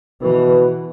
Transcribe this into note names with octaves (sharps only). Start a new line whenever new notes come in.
B2 E3